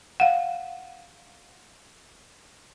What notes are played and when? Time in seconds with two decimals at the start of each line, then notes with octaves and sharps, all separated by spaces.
0.20 F5 F#5